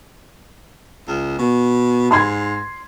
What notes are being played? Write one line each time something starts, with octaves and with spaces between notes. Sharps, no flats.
C#2
B2
G#2 C6 G#6